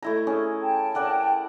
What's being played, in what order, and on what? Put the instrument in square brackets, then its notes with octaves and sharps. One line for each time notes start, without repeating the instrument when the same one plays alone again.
[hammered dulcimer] A3 E4 A#5
C#4 G#4
[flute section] G5 A5
[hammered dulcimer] A#4 D5 F#5